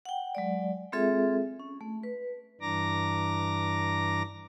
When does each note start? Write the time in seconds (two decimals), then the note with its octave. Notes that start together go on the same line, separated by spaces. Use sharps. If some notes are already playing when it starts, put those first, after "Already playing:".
0.05 F#5 G5
0.35 F#3 G#3 D5
0.93 G#3 C4 F4 G#4 A4 E5
1.60 C#4
1.81 A3
2.03 B4
2.61 G2 E3 D4 A#5 D6 A#6